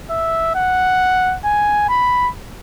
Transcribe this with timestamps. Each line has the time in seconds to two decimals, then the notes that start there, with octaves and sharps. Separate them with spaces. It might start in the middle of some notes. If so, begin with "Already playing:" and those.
0.10 E5
0.56 F#5
1.45 G#5
1.89 B5